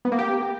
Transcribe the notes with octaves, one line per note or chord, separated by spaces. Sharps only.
B3
A#3
G4